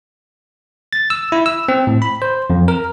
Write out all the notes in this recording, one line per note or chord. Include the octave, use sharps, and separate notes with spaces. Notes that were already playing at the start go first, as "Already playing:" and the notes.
A6
E6
E4
E6
C4
A2
B5
C5
F2
A#4